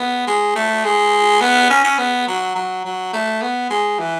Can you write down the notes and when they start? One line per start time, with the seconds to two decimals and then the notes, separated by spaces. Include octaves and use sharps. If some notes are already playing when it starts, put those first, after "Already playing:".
Already playing: B3
0.27 G#3
0.55 A3
0.85 G#3
1.41 B3
1.70 C#4
1.84 C#4
1.99 B3
2.28 F#3
2.55 F#3
2.85 F#3
3.13 A3
3.42 B3
3.70 G#3
3.99 E3